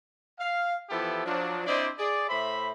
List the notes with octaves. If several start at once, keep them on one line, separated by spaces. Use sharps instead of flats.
F5
E3 F3 B3 E4 G4 A4
F3 F#3 D4
C4 D4 E4 C5 D5 D#5
G#4 D5
A2 C5 E5 B5